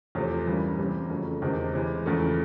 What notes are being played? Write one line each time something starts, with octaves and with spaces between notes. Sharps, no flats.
E2 C3 F3 A3
G2 E3 G3 A#3 C#4
C3 E3 G3 C4
F2 C#3 F#3 A3
E2 C3 D#3 G#3 C4
C3 E3 G#3
E2 C#3 F3 A3